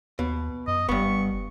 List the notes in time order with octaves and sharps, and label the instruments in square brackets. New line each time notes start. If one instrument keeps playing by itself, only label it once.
[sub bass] D#2 [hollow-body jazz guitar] B2
[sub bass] F#2 [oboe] D#5
[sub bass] F#1 [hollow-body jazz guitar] G2 B3 [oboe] C#6